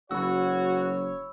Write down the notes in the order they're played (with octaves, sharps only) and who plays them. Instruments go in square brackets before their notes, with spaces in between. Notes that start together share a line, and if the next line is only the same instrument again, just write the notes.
[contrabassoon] F#1 [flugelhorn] F#4 [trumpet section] C#5 [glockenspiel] B5 E6